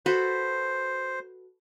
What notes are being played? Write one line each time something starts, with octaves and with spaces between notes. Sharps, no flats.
F#4 A4 B4 C5